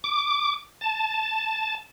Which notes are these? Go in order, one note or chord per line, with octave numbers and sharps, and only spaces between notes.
D6
A5